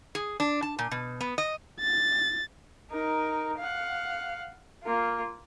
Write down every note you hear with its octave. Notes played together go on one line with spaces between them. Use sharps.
G#4
D4
A5
A#2
B2
B3
D#5
A6
D#4 A#4
F5 F#5
A#3 F4